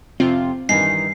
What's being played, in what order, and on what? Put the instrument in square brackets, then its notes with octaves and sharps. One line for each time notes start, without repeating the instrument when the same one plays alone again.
[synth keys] F2 C3 F4 [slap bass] C4
[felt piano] G2 G#5 [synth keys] D#3 E3 D#4 [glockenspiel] C7